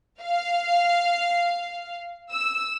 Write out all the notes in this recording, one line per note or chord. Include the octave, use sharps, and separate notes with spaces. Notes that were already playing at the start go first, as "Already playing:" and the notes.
F5
E6